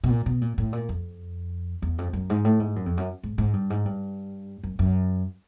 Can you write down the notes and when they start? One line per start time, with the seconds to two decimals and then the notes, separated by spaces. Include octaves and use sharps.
0.04 B2
0.10 A#2
0.26 B2
0.41 A#2
0.58 A2
0.73 A#2
0.89 F2
1.82 E2
1.98 F2
2.13 F#2
2.30 G#2
2.45 A2
2.60 G#2
2.76 F#2
2.86 F2
2.97 F#2
3.23 G#2
3.38 G#2
3.53 G2
3.70 G#2
3.85 G2
4.63 F#2
4.79 F#2